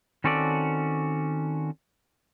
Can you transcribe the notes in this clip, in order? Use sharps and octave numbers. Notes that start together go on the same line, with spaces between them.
D#3 C4 C#4 F#4 A4 D5